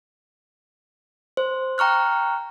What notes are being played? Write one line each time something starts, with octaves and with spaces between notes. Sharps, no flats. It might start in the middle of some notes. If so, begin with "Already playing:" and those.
C5
G5 A#5 C#6 F6 F#6